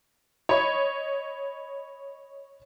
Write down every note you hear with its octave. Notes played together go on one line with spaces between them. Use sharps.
C#5 D#5 B5 C#6